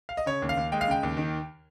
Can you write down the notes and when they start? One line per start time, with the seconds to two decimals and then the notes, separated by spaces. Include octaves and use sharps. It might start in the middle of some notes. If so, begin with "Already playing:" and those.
0.09 F5
0.17 D#5
0.26 C#3 C#5
0.42 D#2
0.49 F5
0.57 D#2
0.72 G#3 G5
0.81 F5
0.88 C#3 G5
1.03 D#2
1.17 D#3